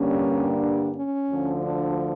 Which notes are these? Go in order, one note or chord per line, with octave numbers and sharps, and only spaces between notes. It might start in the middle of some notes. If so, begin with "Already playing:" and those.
Already playing: G2 D3 G3 A#3 C#4
D4
C#4
D2 D3 F3
D4